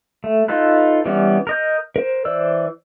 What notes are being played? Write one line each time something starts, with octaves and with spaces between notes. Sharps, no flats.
A3
D#4 F4 A4 B4
E3 G3 B3 C#4
A#4 D#5 G6
A#4 C5
E3 C5 D5 E6